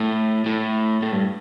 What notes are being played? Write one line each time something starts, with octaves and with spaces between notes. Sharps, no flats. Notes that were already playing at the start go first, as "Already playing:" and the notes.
Already playing: A2
A2
A2
G2